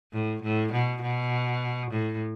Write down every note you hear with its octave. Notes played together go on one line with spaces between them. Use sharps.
A2
A2
B2
B2
A2